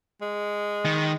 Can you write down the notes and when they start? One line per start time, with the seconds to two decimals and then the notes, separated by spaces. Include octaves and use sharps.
0.21 G#3
0.86 D#3